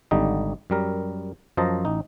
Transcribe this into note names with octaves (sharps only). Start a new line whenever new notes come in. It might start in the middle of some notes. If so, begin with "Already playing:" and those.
G#1 D3 G3 D#4 D#5
F#2 G3 A#4
F#2 F3 C5 D#5 A5 A#5
A1 D#4